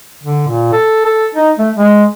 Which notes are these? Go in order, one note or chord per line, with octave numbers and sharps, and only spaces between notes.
D3
A#2
A4
A4
D#4
A3
G#3